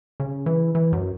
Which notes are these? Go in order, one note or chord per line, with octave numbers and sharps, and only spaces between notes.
C#3
E3
E3
F#2